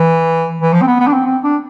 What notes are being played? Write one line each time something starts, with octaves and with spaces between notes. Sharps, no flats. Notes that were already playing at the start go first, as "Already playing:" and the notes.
Already playing: E3
E3
F3
C4
B3
B3
D4
C4
C4
D4